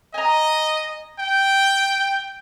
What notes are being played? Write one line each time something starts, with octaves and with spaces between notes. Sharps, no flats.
D#5 G#5 A#5
G5